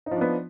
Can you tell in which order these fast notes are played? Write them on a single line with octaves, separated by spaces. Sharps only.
D#4 F3 D4 B3